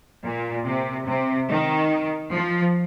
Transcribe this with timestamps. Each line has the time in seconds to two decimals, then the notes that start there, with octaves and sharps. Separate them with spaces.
0.24 A#2
0.66 C3
1.07 C3
1.49 D#3
2.33 F3